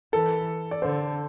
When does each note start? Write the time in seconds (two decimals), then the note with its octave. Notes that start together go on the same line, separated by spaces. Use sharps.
0.13 E3 A4
0.71 D5
0.82 D3 C5